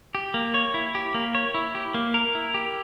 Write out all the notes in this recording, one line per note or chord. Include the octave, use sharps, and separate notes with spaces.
G4
A#3
C#5
E4
G4
A#3
C#5
E4
G4
A#3
A#4
E4
G4